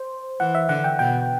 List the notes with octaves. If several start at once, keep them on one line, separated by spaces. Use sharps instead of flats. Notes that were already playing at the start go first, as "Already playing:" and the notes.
Already playing: C5
E3 F#5
E5
D3 F#5
G5
B2 G5